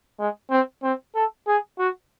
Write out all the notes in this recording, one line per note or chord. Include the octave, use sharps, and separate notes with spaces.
G#3
C4
C4
A4
G#4
F#4